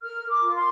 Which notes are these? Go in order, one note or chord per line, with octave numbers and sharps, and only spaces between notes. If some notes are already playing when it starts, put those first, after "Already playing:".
A#4 F6
A#4
D6
F4
C6